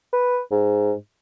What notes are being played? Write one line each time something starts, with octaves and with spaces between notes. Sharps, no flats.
B4
G#2